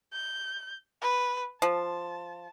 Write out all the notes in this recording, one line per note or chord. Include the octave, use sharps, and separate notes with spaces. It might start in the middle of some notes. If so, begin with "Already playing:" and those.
G6
B4
F3 A5